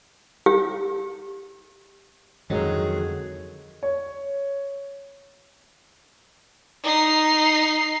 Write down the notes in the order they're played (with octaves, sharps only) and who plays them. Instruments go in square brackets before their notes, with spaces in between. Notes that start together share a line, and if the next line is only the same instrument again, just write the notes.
[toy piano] G4
[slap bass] F2 D3 [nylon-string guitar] D#3 F#3 G#3 [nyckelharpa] G#4
[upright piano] C#5
[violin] D#4 C7